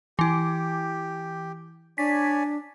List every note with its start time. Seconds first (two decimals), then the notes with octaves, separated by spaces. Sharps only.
0.19 E3 E4 G4
1.98 D4 C#5 D5 G#5 B6